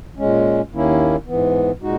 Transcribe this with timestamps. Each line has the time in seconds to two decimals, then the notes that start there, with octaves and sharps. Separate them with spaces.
0.17 A#2 G#3 C#4
0.72 D#2 D#3 A#3 C#4 E4
1.27 G#2 E3 B3
1.82 A#2 G#3 D#4 F#4